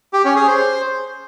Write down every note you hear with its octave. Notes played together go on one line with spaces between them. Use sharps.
G4
C#4
G#4
C5